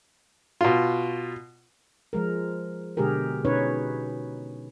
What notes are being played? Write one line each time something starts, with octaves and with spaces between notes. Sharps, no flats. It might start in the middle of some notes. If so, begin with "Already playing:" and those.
B2 F4
F3 G#3 A#4
B2 D3 G#3 G4 G#4 A#4
B2 C#4 D#4 B4 C#5